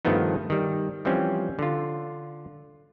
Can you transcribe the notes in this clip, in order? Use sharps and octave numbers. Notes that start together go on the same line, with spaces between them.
G2 D#3 F3 A3 B3 D#4
D#3 G3
E3 F3 G3 C4 C#4
D3 F4